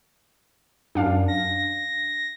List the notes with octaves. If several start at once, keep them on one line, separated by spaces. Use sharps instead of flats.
F#2 D4 F5
A#6